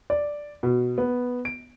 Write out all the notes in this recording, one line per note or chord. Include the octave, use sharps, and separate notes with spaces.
D5
B2
B3
D7